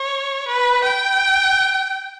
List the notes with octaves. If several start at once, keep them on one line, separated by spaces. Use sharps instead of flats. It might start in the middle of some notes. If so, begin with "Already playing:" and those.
Already playing: C#5
B4
G5